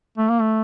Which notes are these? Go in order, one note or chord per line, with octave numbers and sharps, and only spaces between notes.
A3
A#3
A3